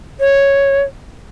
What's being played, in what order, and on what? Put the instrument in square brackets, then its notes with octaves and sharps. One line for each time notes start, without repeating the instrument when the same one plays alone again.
[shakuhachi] C#5